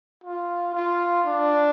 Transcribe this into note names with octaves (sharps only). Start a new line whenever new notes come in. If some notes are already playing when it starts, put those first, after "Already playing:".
F4
F4
D4